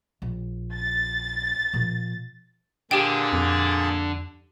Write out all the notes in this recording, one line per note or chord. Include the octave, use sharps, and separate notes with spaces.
A#1
A6
A#2 F3
A#2 D3 G4 G#4 G5 A5
F2